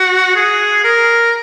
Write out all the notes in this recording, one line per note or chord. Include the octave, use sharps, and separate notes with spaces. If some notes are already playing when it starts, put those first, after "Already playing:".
Already playing: F#4
G#4
A#4